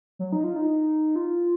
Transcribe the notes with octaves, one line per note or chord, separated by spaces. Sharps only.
F#3
D#4
F4
D#4
F4